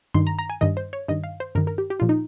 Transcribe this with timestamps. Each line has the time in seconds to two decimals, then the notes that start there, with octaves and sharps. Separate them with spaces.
0.14 G2 D#3 C6
0.27 A#5
0.39 A#5
0.50 G#5
0.61 G2 D#3 D#5
0.77 C5
0.93 C#5
1.08 G2 D#3 D#5
1.24 F5
1.40 C5
1.55 G2 D#3 A#4
1.67 A#4
1.78 G4
1.90 G4
2.00 A#2 F3 F4
2.09 D#4